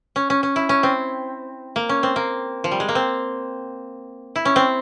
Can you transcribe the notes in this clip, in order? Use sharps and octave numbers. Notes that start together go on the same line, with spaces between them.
C#4
C#4
C#4
E4
C#4
C4
A#3
C#4
C4
A#3
F3
G3
G#3
A#3
C4
E4
C#4
C4